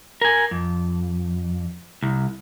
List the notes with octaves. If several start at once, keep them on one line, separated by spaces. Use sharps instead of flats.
A#4 G#5
F2
C2